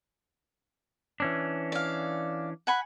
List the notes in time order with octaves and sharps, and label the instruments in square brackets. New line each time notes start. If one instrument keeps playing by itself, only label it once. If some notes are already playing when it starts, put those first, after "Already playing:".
[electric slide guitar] E3 C#4 D4
[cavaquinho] D5 F5
F#5 G#5 B5